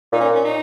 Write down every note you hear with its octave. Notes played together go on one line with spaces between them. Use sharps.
A#2 D#4
C#4
C#4
D#4